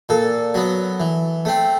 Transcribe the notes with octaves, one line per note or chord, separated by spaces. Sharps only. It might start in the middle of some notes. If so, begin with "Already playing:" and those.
A#2 A4
F#3 B3
E3
A3 C4